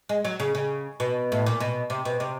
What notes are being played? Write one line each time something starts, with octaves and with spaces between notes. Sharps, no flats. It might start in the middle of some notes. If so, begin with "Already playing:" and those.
G#3
F#3
C#3
C#3
B2
A2
A#2
B2
C3
B2
C3